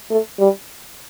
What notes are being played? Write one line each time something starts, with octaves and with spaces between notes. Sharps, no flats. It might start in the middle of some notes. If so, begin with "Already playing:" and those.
A3
G3